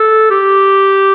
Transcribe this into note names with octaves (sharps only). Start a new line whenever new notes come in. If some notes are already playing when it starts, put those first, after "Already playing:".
Already playing: A4
G4